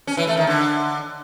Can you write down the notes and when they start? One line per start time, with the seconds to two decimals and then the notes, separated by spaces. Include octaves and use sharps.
0.07 C#4
0.17 E3
0.27 A3
0.37 D#3
0.47 D3